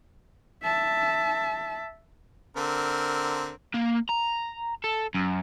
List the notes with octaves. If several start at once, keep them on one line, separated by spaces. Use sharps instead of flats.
E5 A5
D3 C4 A#4
A#3
A#5
A4
F#2